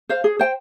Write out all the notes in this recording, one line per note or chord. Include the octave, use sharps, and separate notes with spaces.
C5 F5
G#4
C5 G5